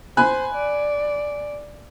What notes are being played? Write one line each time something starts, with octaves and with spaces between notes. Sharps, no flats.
C5 G#5 B5 F#6
D5